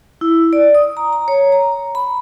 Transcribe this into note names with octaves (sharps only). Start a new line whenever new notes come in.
E4
D5
D#6
A#5
A#5
C#5
A#5
B5